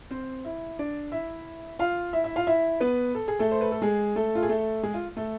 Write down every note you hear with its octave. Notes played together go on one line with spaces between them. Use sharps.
C4 C5
E4
D4 D5
E4 E5
F4 F5
E4 E5
E4 E5
F4 F5
E4 E5
B3 B4
A4
G#4
A3 A4
C5
B4
A4
G#3 G#4
A3 A4
F4
G#4
A3 A4
G#3 G#4
F4
A3 A4